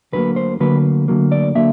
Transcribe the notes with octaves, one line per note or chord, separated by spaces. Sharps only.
D2 D3 F#3 A#3 B4
C5
D2 D3 F#3 A#3 B4
D2 D3 F#3 A#3
D5
D3 F#3 A#3 E5